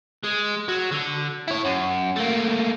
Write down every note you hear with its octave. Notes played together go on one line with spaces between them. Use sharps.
G#3
F#3
D3
E4 C#5
F#2
A3 A#3